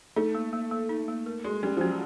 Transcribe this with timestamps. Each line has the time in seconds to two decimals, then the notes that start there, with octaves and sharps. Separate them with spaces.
0.16 A3 D#4
0.35 A#3
0.53 A#3
0.71 A#3
0.89 D#4
1.08 A#3
1.26 A#4
1.44 G#3 F#4
1.63 G3 C#4
1.77 F3
1.81 F#3 C#4